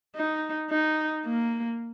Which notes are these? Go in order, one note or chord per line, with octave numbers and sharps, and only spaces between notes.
D#4
D#4
A#3